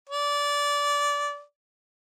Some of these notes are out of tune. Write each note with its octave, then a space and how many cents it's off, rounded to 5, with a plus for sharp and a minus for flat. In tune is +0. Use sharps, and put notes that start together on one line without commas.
D5 -20